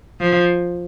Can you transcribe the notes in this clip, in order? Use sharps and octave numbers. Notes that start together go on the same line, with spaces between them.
F3